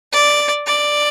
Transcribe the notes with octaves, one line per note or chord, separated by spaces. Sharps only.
D5
D5